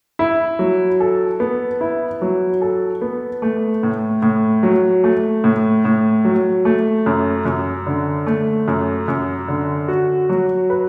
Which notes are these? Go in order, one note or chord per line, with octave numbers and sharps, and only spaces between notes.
E4
F#3
A4
B3
E4
F#3
A4
B3
A3
A2
A2
F#3
A3
A2
A2
F#3
A3
F#2
F#2
D3
A3
F#2
F#2
D3
F#4
F#3
B4